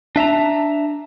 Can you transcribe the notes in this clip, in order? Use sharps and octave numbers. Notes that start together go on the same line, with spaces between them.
D4 E5 A5 A#5